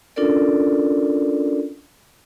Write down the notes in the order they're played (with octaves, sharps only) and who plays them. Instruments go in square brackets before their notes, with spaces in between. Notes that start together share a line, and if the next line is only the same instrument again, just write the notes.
[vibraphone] C#4 D4 F4 A4 A#4 D5